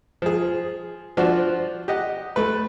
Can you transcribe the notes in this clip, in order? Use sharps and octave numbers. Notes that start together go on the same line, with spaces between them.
F3 G#4
F3 D4 F#4 C5
G4 D#5 F#5
A3 B4